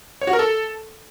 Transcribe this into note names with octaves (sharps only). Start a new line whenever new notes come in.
C#5
F#4
A#4
A4